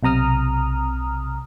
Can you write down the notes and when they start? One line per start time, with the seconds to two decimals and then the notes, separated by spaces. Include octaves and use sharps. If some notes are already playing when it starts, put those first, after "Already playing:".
0.03 B1 C3 A#5 D#6 F6